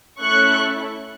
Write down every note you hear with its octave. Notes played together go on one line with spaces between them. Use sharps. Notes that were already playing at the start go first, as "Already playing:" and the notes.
A3 C#4 E4 A4 C#6 F#6